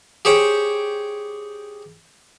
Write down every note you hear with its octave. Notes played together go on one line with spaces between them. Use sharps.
G4 G#4 C5 C#5 G5